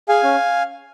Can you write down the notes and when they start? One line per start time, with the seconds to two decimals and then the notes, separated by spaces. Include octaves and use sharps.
0.09 G#4 F5 G#5
0.24 C#4